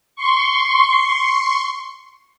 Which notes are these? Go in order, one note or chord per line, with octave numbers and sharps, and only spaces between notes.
C6 C#6